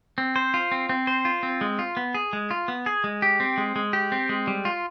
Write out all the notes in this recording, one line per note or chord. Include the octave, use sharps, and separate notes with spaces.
C4
C5
F4
C4
C4
C5
F4
C4
G#3
F4
B3
G#4
G#3
F4
B3
G#4
G#3
G4
C4
G#3
G#3
G4
C4
G#3
G3
F4